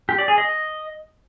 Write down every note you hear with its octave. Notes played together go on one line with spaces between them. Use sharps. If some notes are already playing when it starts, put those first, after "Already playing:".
G4
D5
G#4
D#5